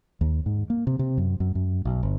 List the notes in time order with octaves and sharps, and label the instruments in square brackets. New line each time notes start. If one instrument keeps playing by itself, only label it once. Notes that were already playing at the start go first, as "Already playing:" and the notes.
[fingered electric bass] D#2
G#2
A#3
C3
C3
F#2
F#2
F#2
B1
G1